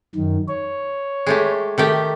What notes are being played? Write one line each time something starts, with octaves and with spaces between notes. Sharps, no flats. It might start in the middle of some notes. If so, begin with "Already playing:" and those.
F#2 D#3
C#5
G#3 A3 G4
D#3 A3 G4